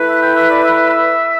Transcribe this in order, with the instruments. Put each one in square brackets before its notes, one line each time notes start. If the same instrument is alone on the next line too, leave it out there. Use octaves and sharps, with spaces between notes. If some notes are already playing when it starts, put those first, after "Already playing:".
Already playing: [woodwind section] A3 E4 B4
[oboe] E5
G5
E5
D5
E5